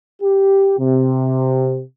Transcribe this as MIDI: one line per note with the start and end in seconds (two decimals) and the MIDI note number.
0.22 0.74 67
0.79 1.82 48